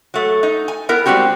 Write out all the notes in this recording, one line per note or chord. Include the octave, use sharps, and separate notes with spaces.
F#3 A3
D#4
G#5
B3 E4 A#4
G3 G#3 C4 F#4 G4